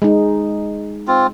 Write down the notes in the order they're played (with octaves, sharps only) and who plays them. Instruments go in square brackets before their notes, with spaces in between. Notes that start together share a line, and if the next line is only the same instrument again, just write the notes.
[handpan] G#3 D#4
[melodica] C4 F4